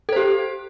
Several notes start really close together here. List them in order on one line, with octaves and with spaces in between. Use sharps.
A4 C5 G4